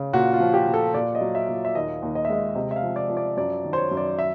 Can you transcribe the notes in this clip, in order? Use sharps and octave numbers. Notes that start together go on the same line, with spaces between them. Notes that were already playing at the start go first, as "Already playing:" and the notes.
Already playing: C#3
A#2 F#4
F4
F3
G4
A#2
A4
A#2 D5
D#5
F#3
E5
A#2
E5
D#2 D#5
D#2
D#5
E5
G#3 D#5
C3 D#5
E5
F5
F3
D5
F3
D5
F#2 D5
D#3
C5
C#5
F#2
D5
E5